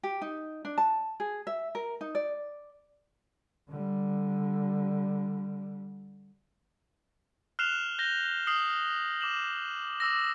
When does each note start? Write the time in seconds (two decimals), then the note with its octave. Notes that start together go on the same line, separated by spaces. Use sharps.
0.03 G4
0.22 D#4
0.65 D4
0.78 A5
1.20 G#4
1.47 E5
1.75 A#4
2.01 D#4
2.15 D5
3.69 D3 G3
7.59 F6 F#6 C7 E7 F7 G7
7.99 G6 A#6 G7
8.47 D#6 F6 C7 F#7
9.21 D6 E7 F#7
10.00 D6 E6 A#6